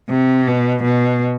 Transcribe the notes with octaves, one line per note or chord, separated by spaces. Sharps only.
C3
B2
B2